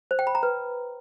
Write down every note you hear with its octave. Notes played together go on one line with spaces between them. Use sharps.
C5
G5
B5
A#5
B4